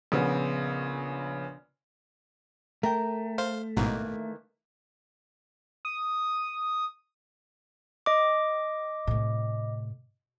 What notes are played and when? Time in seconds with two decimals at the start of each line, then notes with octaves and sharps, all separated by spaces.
0.12 A#1 C#3 B3
2.83 A3 A#4 G5
3.38 C5 F5
3.77 A1 G#2 B2 D#3 E3 A#3
5.85 D#6
8.06 D#5 D6
9.07 A2 C3